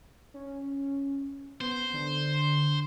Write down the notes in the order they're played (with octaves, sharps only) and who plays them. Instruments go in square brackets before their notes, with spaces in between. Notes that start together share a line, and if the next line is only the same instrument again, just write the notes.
[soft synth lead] C#4
[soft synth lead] B3 [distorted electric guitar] C5
[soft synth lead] D3